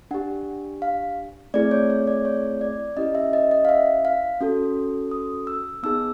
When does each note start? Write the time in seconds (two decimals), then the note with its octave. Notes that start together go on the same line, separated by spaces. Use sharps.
0.11 D4 G4 F#5
0.82 F5
1.54 A3 C4 E4 G#4 D5
1.71 C#5
1.90 C#5
2.07 D5
2.25 C#5
2.61 D5
2.97 C#4 E4 G4 D#5
3.15 E5
3.33 D#5
3.51 D#5
3.65 F5
3.69 E5
4.05 F5
4.41 C#4 F#4 A4
5.11 D#6
5.47 E6
5.83 B3 D#4 G#4 E6